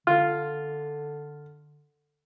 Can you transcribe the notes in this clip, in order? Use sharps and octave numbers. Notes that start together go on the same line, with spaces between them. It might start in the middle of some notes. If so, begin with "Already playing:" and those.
D3 F4